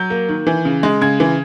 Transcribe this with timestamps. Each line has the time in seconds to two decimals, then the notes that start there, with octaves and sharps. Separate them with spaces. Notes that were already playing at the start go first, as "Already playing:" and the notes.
Already playing: F#3 G6
0.10 A#3
0.29 D#3
0.47 E3
0.65 C#3
0.83 G#3
1.01 C#3 G#6
1.20 E3